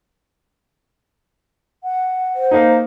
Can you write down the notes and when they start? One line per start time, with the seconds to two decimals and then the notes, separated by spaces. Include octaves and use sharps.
1.84 F#5
2.35 C5
2.51 A#3 D#4 A#5